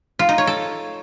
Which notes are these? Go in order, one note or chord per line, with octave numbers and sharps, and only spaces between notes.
F4
D#4
C#5
A4